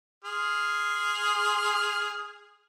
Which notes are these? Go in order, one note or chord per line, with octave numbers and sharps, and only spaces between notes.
G#4 C6 F6